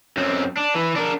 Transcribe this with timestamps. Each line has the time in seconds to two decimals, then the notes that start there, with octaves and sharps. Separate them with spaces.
0.17 F#2 C4
0.57 D4
0.75 E3
0.96 D4 A#4